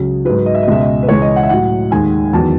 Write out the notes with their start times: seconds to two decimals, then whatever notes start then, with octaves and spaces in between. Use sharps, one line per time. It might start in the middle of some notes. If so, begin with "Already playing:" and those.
Already playing: C#2 C#3 F#3
0.25 G#2 F#3 B4
0.46 D#5
0.55 E5
0.63 D#5
0.68 C#2 B2 G#3 E5
0.80 D#5
1.03 B4
1.08 C#2 C#3 E3 G#3 C#5
1.22 D#5
1.36 F#5
1.43 E5
1.49 A2 F#3 F#5
1.91 D#2 D#3 G#3 G#5
2.33 E2 D#3 F#3 A5